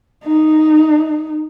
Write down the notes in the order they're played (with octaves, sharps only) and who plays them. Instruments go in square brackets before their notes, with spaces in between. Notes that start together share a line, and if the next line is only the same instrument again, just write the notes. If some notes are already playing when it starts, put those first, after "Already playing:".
[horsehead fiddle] D#4